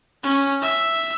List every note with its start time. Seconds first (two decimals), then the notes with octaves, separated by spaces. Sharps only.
0.23 C#4
0.62 E5